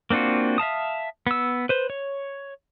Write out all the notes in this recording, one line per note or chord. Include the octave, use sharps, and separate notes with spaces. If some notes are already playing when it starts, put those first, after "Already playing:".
A#3 C4 D4 F4 F#4
E5 F5 A5 D#6
B3 E6
B4 C5
C#5